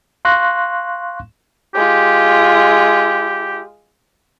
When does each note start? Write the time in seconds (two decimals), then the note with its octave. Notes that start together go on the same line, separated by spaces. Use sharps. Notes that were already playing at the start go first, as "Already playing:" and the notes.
0.25 F5 C6 C#6 F#6 A#6
1.75 G#3 F4 G4